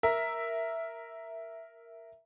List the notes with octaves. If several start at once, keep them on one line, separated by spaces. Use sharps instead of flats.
A#4 E5